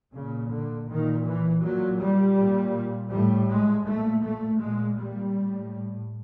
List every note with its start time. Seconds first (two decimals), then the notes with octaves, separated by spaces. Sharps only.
0.13 A#2 C#3
0.50 D3
0.88 A#2 D#3
1.26 E3
1.62 A#2 F#3
1.99 G3
2.37 A#2
3.11 A2 G3
3.49 G#3
3.86 A#2 A3
4.23 A3
4.60 A#2 G#3
4.98 G3
5.34 A2